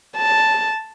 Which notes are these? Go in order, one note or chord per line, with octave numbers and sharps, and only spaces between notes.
A5